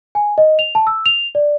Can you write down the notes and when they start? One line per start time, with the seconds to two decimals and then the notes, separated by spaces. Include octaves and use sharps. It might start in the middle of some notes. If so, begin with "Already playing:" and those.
0.15 G#5
0.38 D#5
0.59 F7
0.75 A5
0.87 E6
1.06 F7
1.35 D5